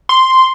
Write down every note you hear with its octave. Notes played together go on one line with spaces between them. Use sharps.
C6